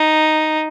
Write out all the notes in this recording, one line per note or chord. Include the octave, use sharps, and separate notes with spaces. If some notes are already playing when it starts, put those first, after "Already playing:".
Already playing: D#4